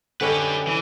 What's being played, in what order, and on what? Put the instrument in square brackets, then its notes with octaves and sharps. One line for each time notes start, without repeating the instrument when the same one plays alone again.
[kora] D3 C#4 D#5 [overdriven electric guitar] G4 B4
[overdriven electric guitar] E3